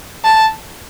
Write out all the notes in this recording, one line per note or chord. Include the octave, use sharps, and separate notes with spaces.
A5